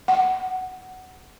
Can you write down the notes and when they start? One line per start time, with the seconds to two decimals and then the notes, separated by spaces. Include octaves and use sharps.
0.08 F#5